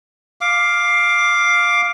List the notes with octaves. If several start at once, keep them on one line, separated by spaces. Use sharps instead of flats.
F5 D6